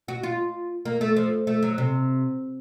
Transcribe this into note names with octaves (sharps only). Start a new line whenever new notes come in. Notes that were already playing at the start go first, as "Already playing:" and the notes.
F#4
F4
A#3
A3
F3
A3
F#3
C3